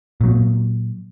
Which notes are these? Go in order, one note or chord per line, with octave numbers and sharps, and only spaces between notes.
A#2 F#3